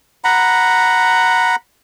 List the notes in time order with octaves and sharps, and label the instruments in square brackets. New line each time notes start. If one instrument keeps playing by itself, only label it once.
[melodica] F#5 A#5 B5